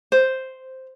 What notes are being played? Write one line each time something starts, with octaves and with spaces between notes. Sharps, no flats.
C5